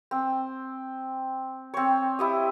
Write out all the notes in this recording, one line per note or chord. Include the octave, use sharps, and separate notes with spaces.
C4
C4 C#5
E4 G4 D#5